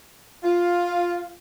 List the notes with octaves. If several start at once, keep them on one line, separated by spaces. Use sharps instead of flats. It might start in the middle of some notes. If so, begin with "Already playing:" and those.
F4